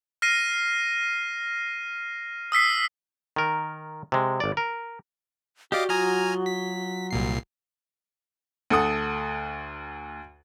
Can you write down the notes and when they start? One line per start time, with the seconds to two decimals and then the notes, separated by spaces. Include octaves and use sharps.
0.22 F6 A#6 C7 D#7
2.52 D#6 E6 B6 C7
3.36 D#3 A#4
4.12 C3 G#3
4.40 G#1 D5
4.57 A#4
5.72 F#4 G4 D5 D#5 F5 D6
5.89 F#3 F4 G#5 A#5 D#6 F6
6.46 B6
7.11 C2 A#2 C7
8.70 D2 A4 F#5 D#6